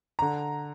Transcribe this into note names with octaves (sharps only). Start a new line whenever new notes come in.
D3 A#5